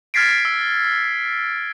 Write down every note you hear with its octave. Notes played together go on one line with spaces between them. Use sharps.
F6 G#6 A6 B6 C7 D7
E6